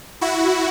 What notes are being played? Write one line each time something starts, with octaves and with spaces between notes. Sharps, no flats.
E4 F#4